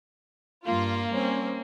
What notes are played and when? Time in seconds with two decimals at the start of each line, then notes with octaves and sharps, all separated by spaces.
0.66 G2 A#3 F4
1.11 G3 C4 C#4